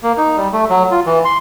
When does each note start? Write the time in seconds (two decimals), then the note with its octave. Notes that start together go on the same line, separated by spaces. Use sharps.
0.03 A#3
0.17 D#4
0.37 G3
0.53 A3
0.70 F#3
0.91 F4
1.06 E3
1.25 C6